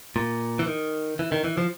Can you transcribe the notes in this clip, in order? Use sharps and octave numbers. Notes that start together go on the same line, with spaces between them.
A#2
E3
D#3
E3
D#3
E3
F3